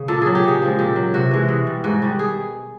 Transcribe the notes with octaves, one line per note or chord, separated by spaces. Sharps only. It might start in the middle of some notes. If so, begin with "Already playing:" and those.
Already playing: C#3
A#2 A4
F#3 G#4
G4
C#3 G#4
F3 G#3
A#2 G4
F#3
C3 F#4
E3 G#3
B2
G3
G#2 F#4
D#3 G3
G#4